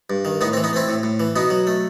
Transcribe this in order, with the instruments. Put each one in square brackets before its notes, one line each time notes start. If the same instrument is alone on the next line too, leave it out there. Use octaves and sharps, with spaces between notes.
[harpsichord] G2
D#3
A2 B3 D#4
C4
E3
B3 D#4
A3 C4 E4
A2
A2
E3
B2 B3 D#4
F#3
A3